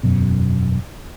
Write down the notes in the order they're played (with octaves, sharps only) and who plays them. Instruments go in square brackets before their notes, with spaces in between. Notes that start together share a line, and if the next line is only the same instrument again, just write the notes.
[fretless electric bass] E1 F#2 B2